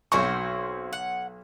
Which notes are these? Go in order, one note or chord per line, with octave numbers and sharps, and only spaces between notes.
B1 C4 F#4 C5 C#6
F#5